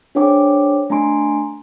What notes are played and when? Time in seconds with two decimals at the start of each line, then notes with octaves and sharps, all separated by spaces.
0.15 D4 G#4 C5 C#5 G5 D6
0.90 A3 D4 G#5 A#5 C6 D7